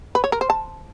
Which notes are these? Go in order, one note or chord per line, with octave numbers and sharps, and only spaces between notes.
B4
C#5
A#4
C5
A5